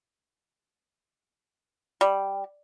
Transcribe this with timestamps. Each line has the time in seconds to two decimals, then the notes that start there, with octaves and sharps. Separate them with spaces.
2.01 G3